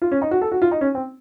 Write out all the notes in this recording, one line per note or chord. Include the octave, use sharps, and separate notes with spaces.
F4
C#4
D#4
F#4
A4
F#4
F4
D#4
C#4
C4